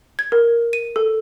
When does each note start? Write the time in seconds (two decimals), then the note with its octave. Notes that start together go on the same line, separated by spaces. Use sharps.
0.19 G#6
0.32 A#4
0.73 D#7
0.96 A4